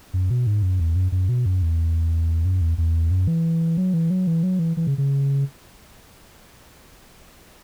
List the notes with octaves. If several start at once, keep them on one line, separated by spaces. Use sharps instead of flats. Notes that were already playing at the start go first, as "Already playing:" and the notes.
F#2
B2
G#2
F#2
E2
F#2
F#2
B2
F#2
E2
F#2
E2
E2
F#2
E3
F#3
E3
F#3
E3
F#3
E3
E3
C#3
C#3